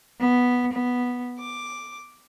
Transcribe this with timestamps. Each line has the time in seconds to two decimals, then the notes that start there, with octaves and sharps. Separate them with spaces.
0.20 B3
0.73 B3
1.38 D6